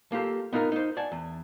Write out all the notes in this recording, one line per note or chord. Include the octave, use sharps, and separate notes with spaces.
A#3 F4 G4 A4
B3 D#4 F4 G#4 A#4
D#4 C5
D5 F#5 G#5 A5
E2